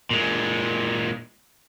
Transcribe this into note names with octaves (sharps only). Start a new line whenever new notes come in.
A#2 G#3